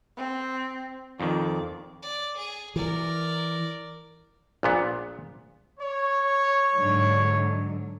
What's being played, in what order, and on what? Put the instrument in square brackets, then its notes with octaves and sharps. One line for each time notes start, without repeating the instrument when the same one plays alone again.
[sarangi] C4
[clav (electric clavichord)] F2 D#3 [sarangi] D5
[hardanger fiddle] D5
G#4
[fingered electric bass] E3 [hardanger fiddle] A#4 D5
[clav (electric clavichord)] A#1 A#2 B3
[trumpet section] C#5
[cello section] G#2 D3 F#3